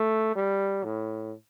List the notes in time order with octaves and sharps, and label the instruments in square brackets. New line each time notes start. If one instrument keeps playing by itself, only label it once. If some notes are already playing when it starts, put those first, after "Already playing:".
Already playing: [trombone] A3
G3
A2